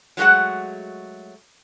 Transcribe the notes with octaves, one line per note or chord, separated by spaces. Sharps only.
F#3 G#3 A3 F#4 G#4 F#5